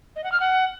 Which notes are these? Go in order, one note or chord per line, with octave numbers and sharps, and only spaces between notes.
D#5
F#5
F6
F#5